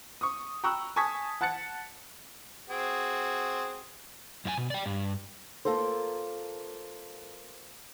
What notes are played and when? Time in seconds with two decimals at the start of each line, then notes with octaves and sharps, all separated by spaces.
0.21 C#6 D#6
0.63 G5 A#5 B5 C#6 E6 F#6
0.96 G#5 A5 C#6 D#6 G#6 B6
1.41 F#5 A5 F#6 A6 C#7
2.70 C4 F#4 G#4
4.45 F#2 F4 G#5
4.58 B2
4.70 D5 G5
4.86 G2
5.65 A#3 F4 A4 A#4 C5